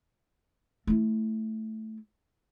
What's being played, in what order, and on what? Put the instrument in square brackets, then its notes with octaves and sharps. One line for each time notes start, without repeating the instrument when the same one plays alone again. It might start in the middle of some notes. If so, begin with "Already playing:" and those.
[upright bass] A3 E4